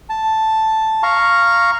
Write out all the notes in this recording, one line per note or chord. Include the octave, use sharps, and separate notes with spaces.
A5
F5 A#5 C#6